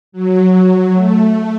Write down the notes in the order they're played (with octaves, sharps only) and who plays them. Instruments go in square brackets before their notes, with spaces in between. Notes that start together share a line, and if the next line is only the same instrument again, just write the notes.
[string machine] F#3
A3